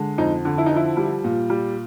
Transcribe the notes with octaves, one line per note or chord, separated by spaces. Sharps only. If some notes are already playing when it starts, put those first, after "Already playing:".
Already playing: D3 G#3
F2 D#4
D3
E4
D#4
F3
E4
G3
A#2
G3